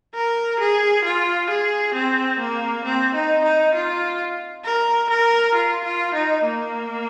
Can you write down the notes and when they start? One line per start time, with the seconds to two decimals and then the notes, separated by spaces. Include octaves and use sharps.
0.15 A#4
0.60 G#4
1.04 F4
1.50 G#4
1.94 C4
2.39 A#3
2.84 C4
3.15 D#4
3.44 D#4
3.74 F4
4.64 A#4
5.10 A#4
5.55 F4
5.84 F4
6.14 D#4
6.44 A#3